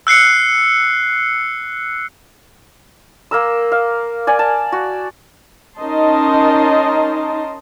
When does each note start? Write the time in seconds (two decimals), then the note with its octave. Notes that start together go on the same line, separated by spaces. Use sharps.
0.07 E6 F#6 C7 C#7
3.31 A#3 A#4 E6
3.72 F5
4.27 D5 G#5
4.39 A5
4.72 F#4
5.78 C#4 D#4 A#4 D#5 A5 C6